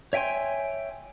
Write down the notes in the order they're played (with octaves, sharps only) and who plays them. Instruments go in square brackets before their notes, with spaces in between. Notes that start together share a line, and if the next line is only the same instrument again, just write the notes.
[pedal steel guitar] C#5 E5 G5 G#5 C6